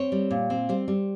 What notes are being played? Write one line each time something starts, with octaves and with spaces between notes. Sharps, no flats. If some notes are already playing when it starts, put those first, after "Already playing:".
Already playing: C4 C#5
G3
A#2
C4
G3 C5
G3